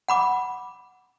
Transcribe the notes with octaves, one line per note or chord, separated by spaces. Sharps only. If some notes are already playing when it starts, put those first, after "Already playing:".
F#5 B5 D6